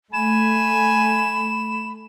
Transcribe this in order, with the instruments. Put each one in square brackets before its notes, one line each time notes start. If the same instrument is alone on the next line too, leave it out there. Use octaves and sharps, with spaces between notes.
[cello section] A3 [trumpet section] G#5 [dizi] B5 [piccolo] E7